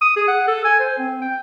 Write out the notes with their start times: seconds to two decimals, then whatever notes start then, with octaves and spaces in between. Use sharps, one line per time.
0.01 D#6
0.16 G#4
0.28 F#5
0.47 A4
0.65 G#5
0.79 C5
0.98 C4
1.22 G5